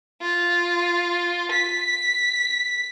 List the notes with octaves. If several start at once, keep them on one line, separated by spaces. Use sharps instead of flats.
F4
B6